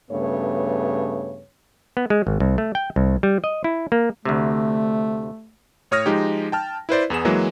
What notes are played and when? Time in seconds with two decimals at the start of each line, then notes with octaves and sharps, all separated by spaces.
0.11 G2 C#3 A3 B3 C#5
1.97 B3
2.10 G#3
2.27 G#1
2.40 C2
2.58 A3
2.75 G5
2.96 C2
3.23 G3
3.44 D#5
3.64 E4
3.92 A#3
4.25 D2 C3 A3
5.91 A2 C#5 D#6 F6 A#6
6.06 F3 G#3 D#4 G4
6.52 G5 A5 F6
6.89 E4 B4 C5 D5
7.10 E2 B3 G#4 E7
7.25 E3 F#3 G#3 A#3